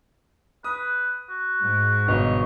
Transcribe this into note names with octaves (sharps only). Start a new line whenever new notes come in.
B4 D#6
F#4
G#2
G1 B2 C#5 D#5